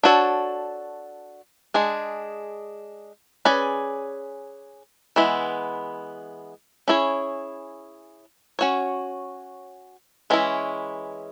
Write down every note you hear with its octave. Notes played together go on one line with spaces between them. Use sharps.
D4 F#4 A4 C#5
G#3 D4 G#4
C#4 G#4 B4 D5
E3 G#3 B3 E4
C#4 E4 G#4 C#5
C#4 F#4 C#5
E3 G#3 C#4 E4